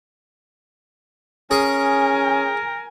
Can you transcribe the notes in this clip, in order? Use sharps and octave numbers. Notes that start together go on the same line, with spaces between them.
C#4 G#4 A#4 G#5